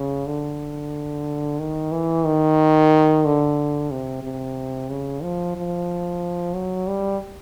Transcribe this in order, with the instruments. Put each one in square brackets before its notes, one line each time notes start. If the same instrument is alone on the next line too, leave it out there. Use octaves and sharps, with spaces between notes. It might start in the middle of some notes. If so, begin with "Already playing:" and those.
Already playing: [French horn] C#3
D3
D#3
E3
D#3
D3
C3
C3
C#3
F3
F3
F#3
G3